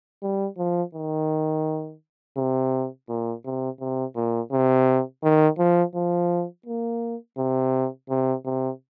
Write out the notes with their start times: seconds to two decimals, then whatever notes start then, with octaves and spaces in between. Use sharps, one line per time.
0.23 G3
0.58 F3
0.95 D#3
2.37 C3
3.09 A#2
3.45 C3
3.80 C3
4.16 A#2
4.52 C3
5.24 D#3
5.59 F3
5.95 F3
6.66 A#3
7.38 C3
8.10 C3
8.45 C3